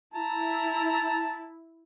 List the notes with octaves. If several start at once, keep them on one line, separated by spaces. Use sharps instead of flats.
E4 A5 A#5